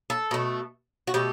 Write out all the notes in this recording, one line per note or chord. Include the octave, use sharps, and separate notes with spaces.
A4
B2 A3
F#4
B2 A3 G4